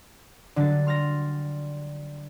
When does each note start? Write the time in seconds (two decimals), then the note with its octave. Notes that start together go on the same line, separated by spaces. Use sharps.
0.56 D3 F#3 G3 A6
0.87 C6 F6 A6 A#6